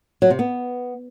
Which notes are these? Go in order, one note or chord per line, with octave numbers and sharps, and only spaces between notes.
F#3
C3
B3